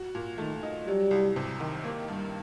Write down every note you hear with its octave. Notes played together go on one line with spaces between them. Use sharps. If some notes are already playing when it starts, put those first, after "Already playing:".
Already playing: F#4
A#2
D#3 A3
D#4
F#3 G3
C2
C3
D#3
A#3
G2